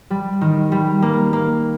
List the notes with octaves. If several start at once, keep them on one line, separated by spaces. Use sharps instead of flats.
G3
D#3
G3
A#3
A#3